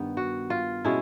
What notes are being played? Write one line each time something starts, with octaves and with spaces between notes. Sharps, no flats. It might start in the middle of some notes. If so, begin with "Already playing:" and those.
Already playing: G2 D#3 B3
F#4
F4
B2 G#3 C#4 E4